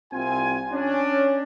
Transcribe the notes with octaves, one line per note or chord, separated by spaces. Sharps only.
C2 C4 F4 G#5
C#4 D4